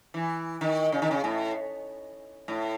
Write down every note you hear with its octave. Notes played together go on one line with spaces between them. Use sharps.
E3
D#3
C#3
D#3
C#3
A2
A2